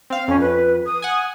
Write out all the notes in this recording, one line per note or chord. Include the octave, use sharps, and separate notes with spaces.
C4 F5
F2 C#4
B4
D#6
F#5 G#5